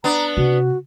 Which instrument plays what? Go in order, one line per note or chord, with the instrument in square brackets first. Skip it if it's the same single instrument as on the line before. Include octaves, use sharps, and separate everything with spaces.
[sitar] B3 D4 [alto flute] A#5
[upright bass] C3 [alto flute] F#4